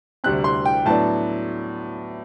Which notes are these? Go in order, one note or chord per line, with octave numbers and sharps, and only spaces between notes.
D2 C3 G3 C4 F#6
C6
G5
A2 F#3 B3 D4 A5